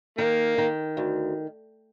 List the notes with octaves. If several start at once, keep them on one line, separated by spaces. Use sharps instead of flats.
D#3 A#3
D#3
D2